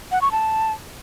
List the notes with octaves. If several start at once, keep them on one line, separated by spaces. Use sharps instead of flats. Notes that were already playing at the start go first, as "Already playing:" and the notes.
F#5
C#6
A5